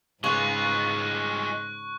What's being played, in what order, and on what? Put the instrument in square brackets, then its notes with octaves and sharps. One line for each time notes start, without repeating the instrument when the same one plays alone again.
[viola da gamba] G#2 [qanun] C#3 B4 [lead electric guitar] G#3 F4 [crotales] C#6 F#6